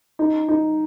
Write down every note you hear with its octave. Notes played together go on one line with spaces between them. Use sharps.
D#4
D#4